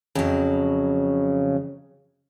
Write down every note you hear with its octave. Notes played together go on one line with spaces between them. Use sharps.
F2 C#3 F#3